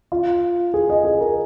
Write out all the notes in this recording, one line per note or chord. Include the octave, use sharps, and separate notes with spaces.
F4
G#4
D#5
G#4
A#4